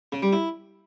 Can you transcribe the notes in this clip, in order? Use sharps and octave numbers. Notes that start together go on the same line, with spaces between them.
C#3
G3
E4